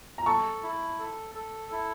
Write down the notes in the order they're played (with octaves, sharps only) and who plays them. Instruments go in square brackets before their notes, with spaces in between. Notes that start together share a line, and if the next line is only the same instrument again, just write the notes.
[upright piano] A#5
[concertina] A4 [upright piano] A5 C#6
[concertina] E4
A4
A4
E4